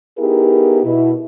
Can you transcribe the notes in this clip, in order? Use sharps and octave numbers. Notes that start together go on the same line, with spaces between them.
B3 D#4 E4 G4 G#4 A#4
B2 E4